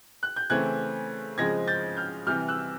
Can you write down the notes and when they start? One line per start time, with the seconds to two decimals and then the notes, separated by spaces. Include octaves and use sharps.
0.23 F#6
0.36 G6
0.50 C#3 E3 A3 C4 F#6 G#6
1.38 C#3 F3 G#3 C4 G#6 A#6
1.67 G6 A6
1.97 F6 G6
2.27 C3 E3 G3 F6 G6
2.48 E6 F#6